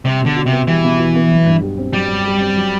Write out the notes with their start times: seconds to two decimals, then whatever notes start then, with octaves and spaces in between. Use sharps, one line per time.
0.05 C3 G3
0.21 B2 D3
0.36 F#4
0.46 C3
0.52 B3
0.67 E3 G3
0.84 B2
0.98 F#4
1.15 B3
1.31 F#3
1.46 G2
1.62 G4
1.78 C4
1.93 F#3 G3
2.08 G2
2.25 G4
2.40 C4
2.56 F#3